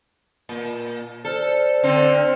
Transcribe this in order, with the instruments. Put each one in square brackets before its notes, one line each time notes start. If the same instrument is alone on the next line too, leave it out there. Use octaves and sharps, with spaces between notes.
[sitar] A#2
[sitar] A4 [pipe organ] C5 D5 F6
[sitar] D3 C4